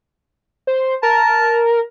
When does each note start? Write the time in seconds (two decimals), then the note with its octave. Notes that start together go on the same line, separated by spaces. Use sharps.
0.67 C5
1.03 A#4 A5